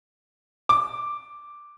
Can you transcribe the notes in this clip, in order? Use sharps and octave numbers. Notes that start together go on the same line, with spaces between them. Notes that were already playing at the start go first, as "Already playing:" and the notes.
D6